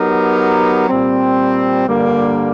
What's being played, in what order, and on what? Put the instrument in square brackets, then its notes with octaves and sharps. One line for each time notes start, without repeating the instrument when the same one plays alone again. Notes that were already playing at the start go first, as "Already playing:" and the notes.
Already playing: [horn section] F#3 B3 D#4 G4 A#4
A#2 G3 C4
G2 D3 G3 A#3